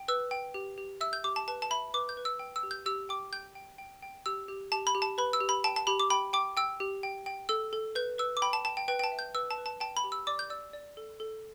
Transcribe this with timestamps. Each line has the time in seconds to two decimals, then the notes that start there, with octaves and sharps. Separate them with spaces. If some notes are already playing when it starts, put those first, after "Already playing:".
Already playing: G5
0.08 B4 E6
0.31 G5
0.54 G4
0.78 G4
1.01 E5 E6
1.13 G6
1.24 G4 D6
1.36 A5
1.48 B4 A5
1.62 A5
1.70 E5 B5
1.94 B4 D6
2.09 G6
2.17 B4
2.25 E6
2.39 G5
2.56 E6
2.63 G4
2.71 G6
2.86 G4 E6
3.09 G5 D6
3.33 G5 G6
3.55 G5
3.78 G5
4.02 G5
4.26 G4 E6
4.48 G4
4.72 G4 A5
4.87 B5
4.95 G4
5.02 A5
5.18 B4 B5
5.33 E6
5.41 G4
5.49 B5
5.64 G5 A5
5.76 A5
5.87 G4 B5
6.00 D6
6.10 G5 B5
6.33 G5 D6
6.57 G5 E6
6.80 G4
7.03 G5
7.26 G5
7.49 A4 E6
7.73 A4
7.95 B4 G6
8.18 B4 E6
8.37 D6
8.42 G5 B5
8.53 A5
8.65 G5 A5
8.77 G5
8.88 B4 G5
8.99 G5
9.04 A5
9.12 E5
9.19 G6
9.35 B4 E6
9.51 A5
9.58 B4
9.66 A5
9.80 G5 A5
9.97 B5
10.04 G4
10.12 E6
10.27 D5 D6
10.39 G6
10.50 D5 E6
10.73 D5
10.97 A4
11.20 A4